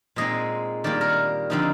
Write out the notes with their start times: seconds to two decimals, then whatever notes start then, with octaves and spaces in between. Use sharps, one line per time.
0.16 A#2 G#3 C4 D#4 D#5
0.84 D#3 G3 A#3 D5
1.01 A#4
1.50 D3 F3 C4 D#4